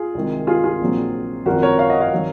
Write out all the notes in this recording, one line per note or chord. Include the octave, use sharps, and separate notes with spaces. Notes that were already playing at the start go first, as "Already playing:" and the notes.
Already playing: F4 G#4
C2 C3 D#3 G#3
F4 G#4
F4 G#4
A#1 A#2 F#3 C4
G#1 F#2 F3 C4 F#4 A#4
A#4 C#5
C#5 F5
D#5 F#5
C#5 F5
D#3 F#3